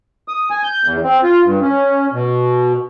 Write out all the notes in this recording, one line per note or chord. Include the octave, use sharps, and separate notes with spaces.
D#6
G#5
G6
E2
C4
F4
G2
C#4
B2